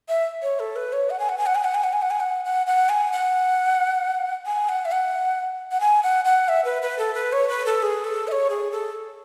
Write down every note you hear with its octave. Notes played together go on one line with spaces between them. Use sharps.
E5
C#5
A4
B4
C#5
F#5
G#5
F#5
G#5
F#5
G#5
F#5
G#5
F#5
G#5
F#5
G#5
F#5
F#5
F#5
G#5
F#5
G#5
F#5
E5
F#5
F#5
G#5
F#5
F#5
E5
B4
B4
A4
B4
C#5
B4
A4
G#4
A4
E5
C#5
G#4
A4